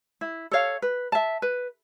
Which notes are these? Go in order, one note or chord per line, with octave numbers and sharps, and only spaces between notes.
E4
A4 C#5 F5
B4
E5 A5
B4